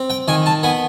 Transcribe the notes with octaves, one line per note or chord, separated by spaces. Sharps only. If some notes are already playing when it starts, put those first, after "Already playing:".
Already playing: C4
G5
D#3 G#5
A5
B3 G#5